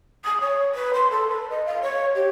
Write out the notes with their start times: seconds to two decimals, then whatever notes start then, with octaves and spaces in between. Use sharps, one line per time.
0.25 D#6
0.41 C#5
0.75 B4
0.94 C6
1.10 A4
1.29 B4
1.50 D#5
1.66 F5
1.82 C#5
2.15 G4